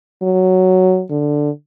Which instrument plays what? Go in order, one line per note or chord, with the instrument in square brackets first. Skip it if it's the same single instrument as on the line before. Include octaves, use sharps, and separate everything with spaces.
[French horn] F#3
D3